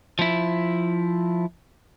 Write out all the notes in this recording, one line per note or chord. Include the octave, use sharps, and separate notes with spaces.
F3 E4